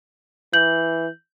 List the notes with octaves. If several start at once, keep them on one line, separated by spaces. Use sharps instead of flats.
E3 G6 F#7